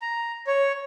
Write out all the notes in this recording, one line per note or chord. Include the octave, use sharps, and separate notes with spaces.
A#5
C#5